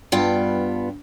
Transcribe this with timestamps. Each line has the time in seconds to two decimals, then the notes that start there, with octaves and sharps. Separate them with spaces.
0.12 G2 B3 F4 G5